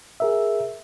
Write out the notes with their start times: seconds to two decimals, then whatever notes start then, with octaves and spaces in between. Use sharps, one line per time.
0.20 G#4 A#4 E5